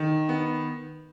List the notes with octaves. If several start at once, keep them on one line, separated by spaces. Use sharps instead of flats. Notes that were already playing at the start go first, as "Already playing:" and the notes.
Already playing: D#3
B3